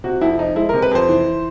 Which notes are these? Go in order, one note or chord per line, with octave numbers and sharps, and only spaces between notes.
C3 F#4
F2 E4
F3 D#4
G#3 E4
A#4
C3
B4
F2 C5
E3